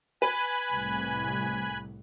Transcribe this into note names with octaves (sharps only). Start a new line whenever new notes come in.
B4 G#5 B5 F#6
C2 A2